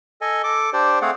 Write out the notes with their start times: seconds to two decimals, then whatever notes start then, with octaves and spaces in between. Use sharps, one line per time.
0.21 A4 D#5 G#5
0.44 A4 D6
0.73 D4 G4 C5 D5
1.02 A3 C4 G#4 F5 F#5